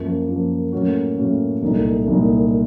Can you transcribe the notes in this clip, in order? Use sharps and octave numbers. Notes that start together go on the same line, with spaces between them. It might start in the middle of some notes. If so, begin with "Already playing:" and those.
Already playing: F#2 F3 A#3
F#2 F3 A#3
A2 F#3 A#3 C#4 F#4
A2 F#3 A#3 C#4 F#4
C2 A#2 F#3 A3 D#4
C2 A#2 F#3 A3 D#4